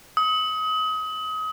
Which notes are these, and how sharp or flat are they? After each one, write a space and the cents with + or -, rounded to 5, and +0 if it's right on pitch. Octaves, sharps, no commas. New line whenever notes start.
D#6 +30